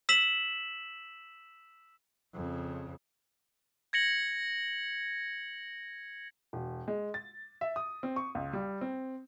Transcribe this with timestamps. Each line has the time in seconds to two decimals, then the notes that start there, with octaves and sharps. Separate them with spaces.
0.09 E6 B6 E7 F#7
2.34 F2 C#3
3.93 G#6 A#6 C#7 F#7
6.53 E1
6.88 G#3
7.14 A6
7.61 E5
7.76 D#6
8.03 C4
8.16 C#6
8.35 C#2
8.53 G3
8.81 C4